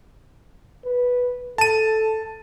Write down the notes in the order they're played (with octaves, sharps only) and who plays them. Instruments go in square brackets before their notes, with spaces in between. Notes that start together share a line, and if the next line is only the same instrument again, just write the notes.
[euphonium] B4
[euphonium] A4 [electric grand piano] A5 D#7